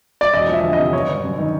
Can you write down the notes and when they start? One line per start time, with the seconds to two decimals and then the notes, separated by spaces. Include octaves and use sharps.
0.21 D5
0.33 E1 D#5
0.48 F3 E5
0.63 D2
0.73 D#5
0.78 C3
0.93 G1 C#5
1.09 G1
1.23 F#2
1.38 D#3